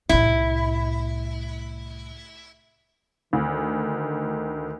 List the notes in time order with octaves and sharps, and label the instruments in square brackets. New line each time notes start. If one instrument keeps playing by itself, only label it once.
[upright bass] C2 A2 [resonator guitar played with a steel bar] E4
[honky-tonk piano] D2 [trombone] D#3